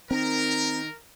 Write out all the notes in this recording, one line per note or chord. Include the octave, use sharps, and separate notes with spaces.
D#3 C4 A#4